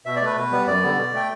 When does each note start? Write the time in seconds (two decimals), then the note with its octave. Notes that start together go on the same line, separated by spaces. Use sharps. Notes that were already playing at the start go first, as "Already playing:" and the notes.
0.06 B2 E5
0.16 D5
0.21 A3 B4
0.36 B2 B4
0.52 G3 B3
0.67 F#2 D5
0.82 D3 G3 B3
0.97 B2
1.13 A3 G5